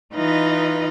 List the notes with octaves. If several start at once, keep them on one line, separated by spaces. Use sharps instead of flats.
E3 D#4 F4 B4 D#5